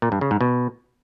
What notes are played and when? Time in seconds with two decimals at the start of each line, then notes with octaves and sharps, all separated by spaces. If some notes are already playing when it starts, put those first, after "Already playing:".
0.02 A#2
0.12 G2
0.21 C#3
0.31 G#2
0.41 B2